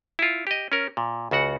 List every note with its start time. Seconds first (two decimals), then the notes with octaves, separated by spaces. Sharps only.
0.19 E4 F4
0.47 G4 D#5
0.72 C#4 A#4
0.97 A#2
1.31 C#2 C#3 F#4 F#5